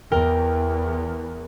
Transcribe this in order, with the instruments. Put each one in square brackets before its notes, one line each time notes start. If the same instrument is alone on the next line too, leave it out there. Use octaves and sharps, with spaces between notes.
[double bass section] E2 [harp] A#4 G5